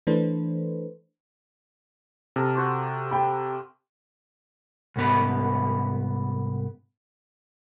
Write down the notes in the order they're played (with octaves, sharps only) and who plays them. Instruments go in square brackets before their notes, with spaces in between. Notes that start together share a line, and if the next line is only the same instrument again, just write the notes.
[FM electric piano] E3 A3 D4 A4 B4 C5
[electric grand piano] C3 [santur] A4 A#4
[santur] F#4 C5 D6
[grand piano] G5 B5
[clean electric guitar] C2 G#2 B3 B4